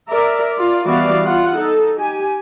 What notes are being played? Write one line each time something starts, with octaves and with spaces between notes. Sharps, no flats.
A#4 D5 E5
F4 D5
E3 G3 B3 F#4 D5 F5
F4 F#5
D#4 A4
G4 G#5